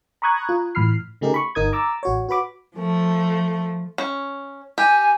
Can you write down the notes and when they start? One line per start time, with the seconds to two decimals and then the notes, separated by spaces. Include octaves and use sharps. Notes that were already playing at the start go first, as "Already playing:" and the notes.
0.22 A#5 B5 C#6 D#6 F#6 G#6
0.49 F4
0.75 A2 E3 B5 F6 C7
1.21 C#3 A3 D#4 G4 G#4 A#4
1.34 B5 C#6
1.55 G1 D#4 A#4 D#6 G#6
1.72 A#5 D6 E6 A6
2.03 A1 F#4 C#5
2.29 F#4 B4 B5 D6
2.77 F3 A3
3.98 C#4
4.78 G4 G#5